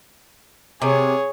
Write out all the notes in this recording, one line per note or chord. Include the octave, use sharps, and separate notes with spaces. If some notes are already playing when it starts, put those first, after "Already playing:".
C3 G#4 C#5